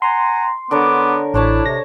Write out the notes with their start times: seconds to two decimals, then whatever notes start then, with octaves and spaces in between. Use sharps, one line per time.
0.02 F#5 G#5 A#5 C6
0.71 D3 B3 A#4 C#5 D6
1.34 A1 D3 D4 E4 C5 C#5 A5
1.66 C3 A#6